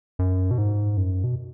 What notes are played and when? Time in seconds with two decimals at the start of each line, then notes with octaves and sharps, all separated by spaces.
0.19 F#2
0.51 B2
0.58 G#2
0.97 F#2
1.24 B2